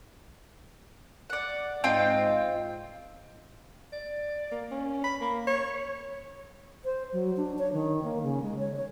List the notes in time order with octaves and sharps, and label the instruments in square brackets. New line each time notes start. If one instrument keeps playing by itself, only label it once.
[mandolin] D5 F#5
[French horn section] G#2 D#5 [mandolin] C4 F4 G5
[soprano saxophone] D5
A#3
C#4
B5
A#3
C#5
[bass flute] C5
F#3
D4
C#5
D#3
A#3
C#3
G#3
C#5
C#5